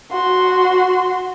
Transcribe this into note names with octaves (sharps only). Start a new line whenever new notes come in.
F#4 C6